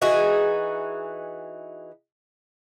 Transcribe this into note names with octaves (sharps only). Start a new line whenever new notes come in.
E3 D#4 F#4 G#4